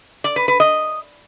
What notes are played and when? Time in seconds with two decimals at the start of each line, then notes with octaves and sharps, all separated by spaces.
0.24 D5
0.36 B4
0.48 B4
0.60 D#5